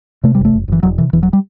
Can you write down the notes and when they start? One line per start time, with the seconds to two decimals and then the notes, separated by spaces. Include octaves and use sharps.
0.24 C3 A3
0.35 F#1 G3
0.45 A3
0.53 F#1
0.68 F#1 E3
0.83 E1 F#3
0.98 C3 E3
1.13 E1 E3
1.23 F#3
1.33 G3